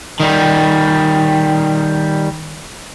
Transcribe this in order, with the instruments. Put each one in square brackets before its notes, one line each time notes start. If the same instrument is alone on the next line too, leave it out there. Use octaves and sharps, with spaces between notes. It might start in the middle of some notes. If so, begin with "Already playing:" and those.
[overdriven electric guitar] D#3 G3